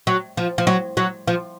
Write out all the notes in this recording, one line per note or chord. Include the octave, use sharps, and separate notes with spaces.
F#3
F3
F3
F#3
F#3
F3